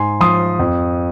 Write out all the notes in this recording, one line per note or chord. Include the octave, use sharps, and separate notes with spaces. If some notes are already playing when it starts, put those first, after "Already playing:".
Already playing: G#2 G#5 C6
F3 C6 D#6
F2